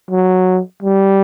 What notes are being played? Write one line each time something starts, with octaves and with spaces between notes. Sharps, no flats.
F#3
G3